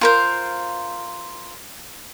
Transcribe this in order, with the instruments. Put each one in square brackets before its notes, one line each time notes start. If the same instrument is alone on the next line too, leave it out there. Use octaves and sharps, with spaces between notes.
[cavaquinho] F4 A#4 C5